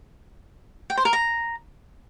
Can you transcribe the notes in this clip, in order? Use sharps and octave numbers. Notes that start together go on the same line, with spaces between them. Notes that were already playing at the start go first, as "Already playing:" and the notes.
G5
C5
A#4
A#5